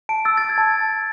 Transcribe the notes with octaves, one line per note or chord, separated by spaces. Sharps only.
A5 D7
E6 A6
A6
E6
G#6
A5